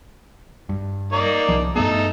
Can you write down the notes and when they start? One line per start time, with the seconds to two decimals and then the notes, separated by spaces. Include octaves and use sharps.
0.69 G2
1.12 A#3 D#4 D5
1.48 C2 F3
1.75 G2 A3 B3 D#4 A4